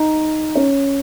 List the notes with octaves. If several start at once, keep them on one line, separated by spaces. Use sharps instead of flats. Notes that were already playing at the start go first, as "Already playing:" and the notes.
Already playing: D#4
C#4